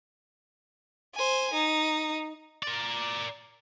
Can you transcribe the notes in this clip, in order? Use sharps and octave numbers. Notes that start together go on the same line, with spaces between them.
C5 G#5
D#4
A#4 D5